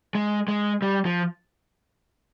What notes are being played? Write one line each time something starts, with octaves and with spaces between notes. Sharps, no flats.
G#3
G#3
G3
F3